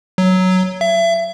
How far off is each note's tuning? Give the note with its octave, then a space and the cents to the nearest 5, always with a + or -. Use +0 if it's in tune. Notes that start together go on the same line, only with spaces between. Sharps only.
F#3 +5
E5 +30